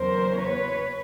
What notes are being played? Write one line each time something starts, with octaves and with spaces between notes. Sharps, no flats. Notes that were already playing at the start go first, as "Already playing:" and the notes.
Already playing: E2 C#3 F#3 A#4 C5
B4 C#5